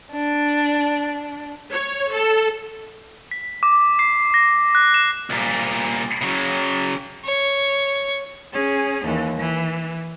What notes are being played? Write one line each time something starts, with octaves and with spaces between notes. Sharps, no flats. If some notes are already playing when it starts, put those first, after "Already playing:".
D4
C#5
A4
B6
D6
C7
A#6
F#6
E7
C2 A#2
C#3 F#3
C#5
C#4 G#4
D#2 E3
E3